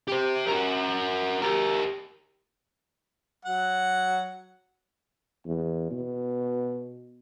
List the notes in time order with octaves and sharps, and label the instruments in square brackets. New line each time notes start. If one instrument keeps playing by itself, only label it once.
[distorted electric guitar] G4 C5
F#4 A#4
G4 A#4
[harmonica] F#3 F#5
[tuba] E2
B2